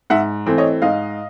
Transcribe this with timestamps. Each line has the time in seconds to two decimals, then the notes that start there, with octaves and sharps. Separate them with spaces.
0.10 G#2 E5 F#5
0.46 E3 A3 C4
0.58 C#5 D#5
0.82 G#2 D#5 F5